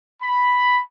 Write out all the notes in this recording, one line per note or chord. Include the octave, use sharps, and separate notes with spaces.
B5